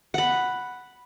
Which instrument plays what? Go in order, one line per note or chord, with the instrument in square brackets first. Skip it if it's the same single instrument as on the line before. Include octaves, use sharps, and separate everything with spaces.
[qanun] F#5 B5